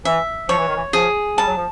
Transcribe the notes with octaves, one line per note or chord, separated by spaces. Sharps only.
E3 E5
F3 C#5
E3
D#3
E3
F3 G#4
G3 A5
F#3
F3